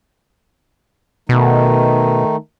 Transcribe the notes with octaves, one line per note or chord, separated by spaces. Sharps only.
B2 D#3 A3 D#4